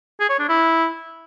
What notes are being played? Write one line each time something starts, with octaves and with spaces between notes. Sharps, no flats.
G#4
C#5
D4
E4